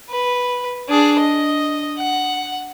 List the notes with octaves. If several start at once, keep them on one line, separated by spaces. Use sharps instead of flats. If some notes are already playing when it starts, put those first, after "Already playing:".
B4
D4 G#4
D#5
F#5